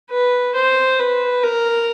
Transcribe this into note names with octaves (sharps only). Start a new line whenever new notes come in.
B4
C5
B4
A#4